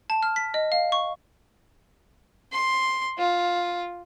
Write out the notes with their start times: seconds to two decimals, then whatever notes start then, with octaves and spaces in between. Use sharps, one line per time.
0.10 A5
0.23 F6
0.36 B6
0.54 D#5
0.72 F5
0.92 C#6
2.52 C6
3.19 F4